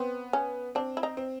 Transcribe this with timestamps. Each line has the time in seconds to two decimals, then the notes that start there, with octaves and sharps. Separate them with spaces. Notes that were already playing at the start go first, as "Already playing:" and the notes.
Already playing: B3 C4
0.33 C#4
0.75 C4 D4
0.97 E4
1.03 D#4
1.17 C4